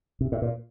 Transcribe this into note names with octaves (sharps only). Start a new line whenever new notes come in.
C3
A2
A#2